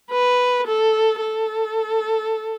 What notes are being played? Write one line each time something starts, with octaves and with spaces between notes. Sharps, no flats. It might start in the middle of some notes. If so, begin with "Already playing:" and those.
B4
A4
A4